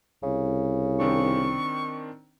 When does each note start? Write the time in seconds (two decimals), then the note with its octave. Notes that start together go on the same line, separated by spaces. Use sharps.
0.23 C2 C#3
1.00 D#3 C4 D4 C#6